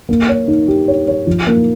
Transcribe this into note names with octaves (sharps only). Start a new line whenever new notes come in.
A#3
C#5
D#4
G4
C#5
C#5
F3
A#3